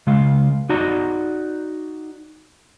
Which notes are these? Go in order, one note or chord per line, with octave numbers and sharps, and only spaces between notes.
C#3 G#3 F5
D#4 F#4 D5 A#5